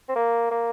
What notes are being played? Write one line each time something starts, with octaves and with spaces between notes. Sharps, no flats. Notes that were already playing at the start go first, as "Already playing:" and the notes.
C4
A#3
A#3